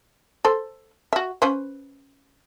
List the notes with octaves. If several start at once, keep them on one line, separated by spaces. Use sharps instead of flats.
A4 C5
F#4 E5
C#4 B4 C5